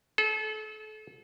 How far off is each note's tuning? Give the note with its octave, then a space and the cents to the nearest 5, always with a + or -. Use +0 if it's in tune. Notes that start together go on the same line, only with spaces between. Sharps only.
A4 -35